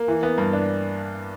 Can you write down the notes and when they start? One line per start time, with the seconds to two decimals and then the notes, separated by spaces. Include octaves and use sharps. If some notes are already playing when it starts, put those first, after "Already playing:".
Already playing: A#3
0.08 E3
0.23 B3
0.38 G2
0.53 D4